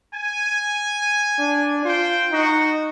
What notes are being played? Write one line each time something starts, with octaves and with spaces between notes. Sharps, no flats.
G#5
D4
F4 C5 G5
D#4 F#4